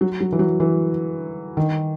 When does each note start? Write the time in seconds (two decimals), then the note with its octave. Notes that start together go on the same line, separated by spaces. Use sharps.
0.01 F#3
0.21 F#3
0.32 E3
0.39 F#3
0.60 E3
1.57 D#3